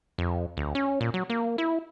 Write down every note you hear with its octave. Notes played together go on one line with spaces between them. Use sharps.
F2
D2
C#4
A#2
F#3
A#3
E4